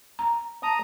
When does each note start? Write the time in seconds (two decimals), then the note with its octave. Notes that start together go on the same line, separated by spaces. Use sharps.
0.19 A#5
0.63 A5 A#5 D#6